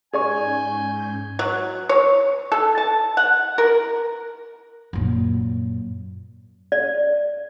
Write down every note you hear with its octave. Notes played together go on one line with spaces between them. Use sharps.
G#2 C#4 G#4 D5 G#5 C#6 G6
F#3
C#5
A4
A5
F#5
A#4
F#2 A#2
D5